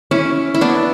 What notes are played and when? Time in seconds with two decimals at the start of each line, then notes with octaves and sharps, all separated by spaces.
0.11 C#4 E4
0.54 E4
0.61 B3 D4